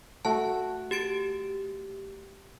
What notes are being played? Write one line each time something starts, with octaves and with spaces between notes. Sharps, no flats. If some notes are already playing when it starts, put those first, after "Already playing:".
A3 F#4 A5
G4 A6 D7